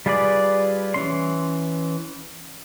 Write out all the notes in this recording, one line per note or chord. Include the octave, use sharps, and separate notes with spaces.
G3 F4 G#4 B4 D5
E3 C#4 C6